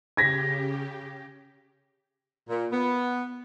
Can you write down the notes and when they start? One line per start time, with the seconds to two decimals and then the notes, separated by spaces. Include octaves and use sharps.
0.17 C#3 G4 G#6 A#6 B6
2.50 A#2
2.72 B3